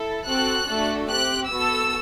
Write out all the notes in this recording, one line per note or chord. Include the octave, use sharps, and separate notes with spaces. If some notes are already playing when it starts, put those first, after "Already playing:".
Already playing: E4 A4
C4 F#4 A4 F#6
A3 D4 F#4 A4
C4 G4 F#6
B3 F#4 A4 E6